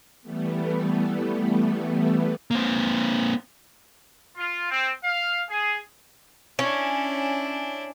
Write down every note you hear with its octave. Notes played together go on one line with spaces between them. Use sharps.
E3 G3 A3 B3
A#3 C4
F4
C4
F5
G#4
C#4 D4 E4